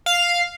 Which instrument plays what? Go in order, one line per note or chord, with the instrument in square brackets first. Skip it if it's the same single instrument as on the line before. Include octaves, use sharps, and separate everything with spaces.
[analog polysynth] F5